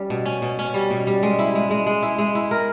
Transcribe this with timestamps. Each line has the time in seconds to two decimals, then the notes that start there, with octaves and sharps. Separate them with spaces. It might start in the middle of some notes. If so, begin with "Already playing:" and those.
Already playing: G3 C#4
0.10 B2
0.25 C#4
0.42 B2
0.59 C#4
0.74 G3
0.90 B2
1.07 G3
1.23 G#3
1.39 E4
1.55 G#3
1.71 G#3
1.87 G#3
2.03 E4
2.18 G#3
2.35 E4
2.51 A#4